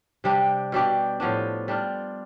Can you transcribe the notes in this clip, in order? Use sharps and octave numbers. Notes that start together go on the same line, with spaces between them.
C3 G3 D4 G4
B2 G3 D4 G4
A2 F3 B3 D4
G3 D4 F4